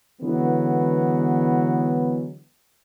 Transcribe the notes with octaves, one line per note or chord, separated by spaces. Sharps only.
D3 E3 F#3 G#3 B3